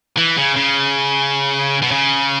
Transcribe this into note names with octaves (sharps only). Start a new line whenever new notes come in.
E3
C#3
C#3
B2
C#3